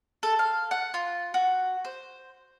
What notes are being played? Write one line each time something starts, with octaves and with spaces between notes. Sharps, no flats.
A4
F5
F#5
F4
F#4
C5